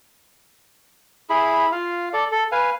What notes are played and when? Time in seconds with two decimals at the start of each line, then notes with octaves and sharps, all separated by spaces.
1.30 E4 G#4 B5
1.72 F4 F5
2.13 A4 D5
2.32 A4
2.52 B4 F5 G#5